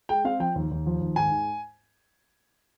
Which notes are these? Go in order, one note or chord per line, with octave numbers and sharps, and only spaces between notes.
G#3 G5
C4 F5
F3 G5
D#2
D#2
F3
D#2
G#2 G#5
G#2